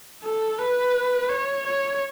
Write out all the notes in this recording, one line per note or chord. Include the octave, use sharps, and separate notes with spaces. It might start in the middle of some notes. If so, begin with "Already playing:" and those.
A4
B4
C#5
C#5